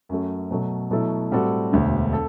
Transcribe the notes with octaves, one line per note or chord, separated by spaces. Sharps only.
F#2 F#3 A3
B2 F#3 A3
B2 F#3 A3 E4 A4
A2 G3 C4 F#4 A4
E1 D2 D3
A4